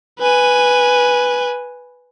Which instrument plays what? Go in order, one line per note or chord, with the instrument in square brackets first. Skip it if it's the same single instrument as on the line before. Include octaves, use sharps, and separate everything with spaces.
[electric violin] B4 G#5